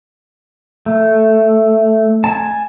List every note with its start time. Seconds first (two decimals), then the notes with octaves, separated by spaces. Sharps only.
0.86 A3
2.24 G#5 A5